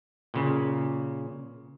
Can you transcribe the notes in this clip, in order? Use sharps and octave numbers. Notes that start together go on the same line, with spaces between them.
A#2 C#3